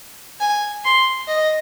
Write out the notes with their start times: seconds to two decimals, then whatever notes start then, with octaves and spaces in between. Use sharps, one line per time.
0.41 G#5
0.85 C6
1.27 D#5